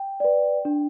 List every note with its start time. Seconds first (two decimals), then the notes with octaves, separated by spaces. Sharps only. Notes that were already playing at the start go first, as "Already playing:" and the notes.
Already playing: G5
0.20 B4 D5
0.65 D4